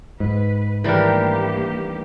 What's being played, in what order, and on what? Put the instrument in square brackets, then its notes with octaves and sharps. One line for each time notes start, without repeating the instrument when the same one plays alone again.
[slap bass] G#2 [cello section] B4
[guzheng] D#3 G3 [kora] E3 D4 A#4 [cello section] A3 A#3 G4